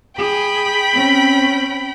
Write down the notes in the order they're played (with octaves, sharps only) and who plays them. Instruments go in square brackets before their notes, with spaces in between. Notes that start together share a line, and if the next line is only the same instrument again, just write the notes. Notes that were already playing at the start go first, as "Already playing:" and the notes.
[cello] G#4 [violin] G5 B5
[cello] C4 C#4